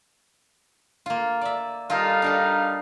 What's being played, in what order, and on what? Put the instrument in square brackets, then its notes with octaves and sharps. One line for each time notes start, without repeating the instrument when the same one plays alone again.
[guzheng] A#3 F4
D5 E5
[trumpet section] G3 D#4 F5 [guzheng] F4 A4 A#4
[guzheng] D4 A#4 A5